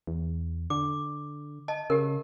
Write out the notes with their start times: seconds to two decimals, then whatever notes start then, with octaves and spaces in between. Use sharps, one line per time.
0.07 E2
0.70 D3 D6
1.68 D#5 A5
1.90 C#3 G4 A#4